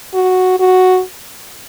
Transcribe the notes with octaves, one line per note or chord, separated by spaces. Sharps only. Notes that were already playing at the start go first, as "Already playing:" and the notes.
F#4
F#4